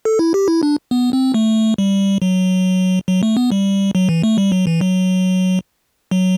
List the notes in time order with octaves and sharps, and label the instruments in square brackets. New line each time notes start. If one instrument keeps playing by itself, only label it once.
[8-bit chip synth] A4
E4
G4
E4
D4
B3
C4
A3
G3
F#3
F#3
A3
B3
G3
F#3
E3
A3
G3
F#3
E3
F#3
F#3